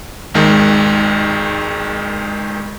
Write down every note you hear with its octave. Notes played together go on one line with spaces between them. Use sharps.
G#1 D#2 D#3 G#3